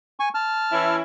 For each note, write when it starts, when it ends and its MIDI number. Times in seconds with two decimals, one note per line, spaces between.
0.20 0.29 80
0.20 0.29 85
0.34 0.96 81
0.34 0.96 89
0.72 1.02 52
0.72 1.02 61
0.72 1.02 64